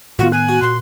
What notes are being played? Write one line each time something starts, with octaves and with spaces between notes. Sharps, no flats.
A2 D#3 B3 F4 F#4
G#5 F#6
F#4
A#2 C6